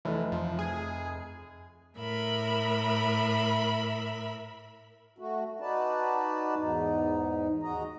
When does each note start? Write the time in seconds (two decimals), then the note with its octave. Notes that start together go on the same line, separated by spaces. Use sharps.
0.05 F1 E3 F3 A3
0.32 F2 F3
0.59 G#4
1.97 A2 A#4 E5 B5
5.18 A3 F#4
5.60 D#4 F#4 B4 D5 A5
6.56 E2 G#2 D#4
7.63 D#2 G#3 F#4 D#5 A#5